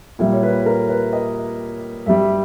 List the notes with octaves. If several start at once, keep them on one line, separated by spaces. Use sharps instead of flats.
A#2 G3 E5
C#5
B4
A#4
B4
D#5
G2 G3 E5